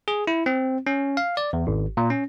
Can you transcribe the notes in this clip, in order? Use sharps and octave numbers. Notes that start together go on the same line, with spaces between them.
G#4
E4
C4
C#4
F5
D5
E2
G#1
A#2
C#4